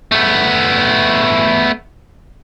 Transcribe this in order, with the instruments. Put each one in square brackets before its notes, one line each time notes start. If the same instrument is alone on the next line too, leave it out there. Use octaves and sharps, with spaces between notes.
[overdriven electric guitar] A3 B3